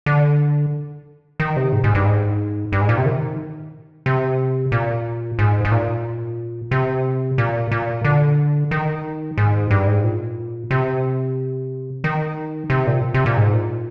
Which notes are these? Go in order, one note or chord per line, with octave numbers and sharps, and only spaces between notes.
D3
D#3
C3
G#2
G#2
G2
G#2
G2
G#2
A#2
C3
D#3
C3
A#2
G#2
G#2
A#2
C3
A#2
A#2
D3
D#3
G#2
G2
G#2
A#2
C3
D#3
C3
A#2
C3
A#2
G#2
A#2